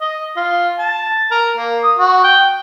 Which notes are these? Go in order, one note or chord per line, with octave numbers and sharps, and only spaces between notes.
D#5
F4
A5
A#4
A#3
D#6
F#4
G5